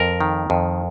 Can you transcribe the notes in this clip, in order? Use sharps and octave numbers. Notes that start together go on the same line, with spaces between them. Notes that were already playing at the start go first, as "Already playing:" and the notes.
Already playing: F2 A#4
D#3
F2